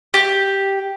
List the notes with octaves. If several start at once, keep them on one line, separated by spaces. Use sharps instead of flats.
G4